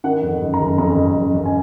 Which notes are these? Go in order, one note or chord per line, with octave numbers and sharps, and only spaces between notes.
D#3 F#5
F2
F#1
A#5
F#1
F2 A#5
F#1
F#1
F#1
G#5